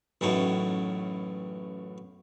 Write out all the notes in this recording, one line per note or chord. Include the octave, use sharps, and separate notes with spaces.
A1 F#2 A2 D#4